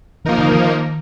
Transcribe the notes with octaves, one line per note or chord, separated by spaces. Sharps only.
D#3 F3 A#3 D#4 A#4
D3
D#3